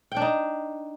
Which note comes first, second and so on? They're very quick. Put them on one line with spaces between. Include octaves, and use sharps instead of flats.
G5 D4 D#4